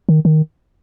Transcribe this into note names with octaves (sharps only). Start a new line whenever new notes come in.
D#3
D#3